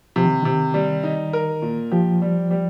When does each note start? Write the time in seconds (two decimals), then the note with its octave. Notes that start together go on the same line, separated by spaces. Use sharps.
0.16 C3 F3
0.25 D#3
0.43 C3 D#3
0.74 G3
1.03 D#4
1.33 A#4
1.62 A#2
1.92 F3 G4
2.22 G3
2.51 G3